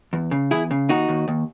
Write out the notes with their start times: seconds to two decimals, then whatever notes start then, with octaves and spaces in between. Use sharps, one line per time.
0.13 E2
0.31 C#3
0.51 E2 E4 G#4
0.71 C#3
0.89 D#2 D#4 F#4
1.09 D#2
1.28 D#2